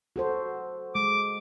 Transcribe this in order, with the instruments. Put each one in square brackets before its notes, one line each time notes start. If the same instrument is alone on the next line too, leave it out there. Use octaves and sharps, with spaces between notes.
[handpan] F#4 A4 C5
[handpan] G#3 [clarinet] D6